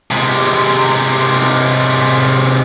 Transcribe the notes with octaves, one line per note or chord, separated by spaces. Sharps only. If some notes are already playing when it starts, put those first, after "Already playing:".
C3 G#3